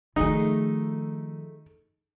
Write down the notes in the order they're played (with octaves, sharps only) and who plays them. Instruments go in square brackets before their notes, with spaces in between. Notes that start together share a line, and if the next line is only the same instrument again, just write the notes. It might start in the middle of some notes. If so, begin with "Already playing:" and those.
[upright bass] D#3 F3 [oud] A3 F#4 G#4 [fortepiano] D#4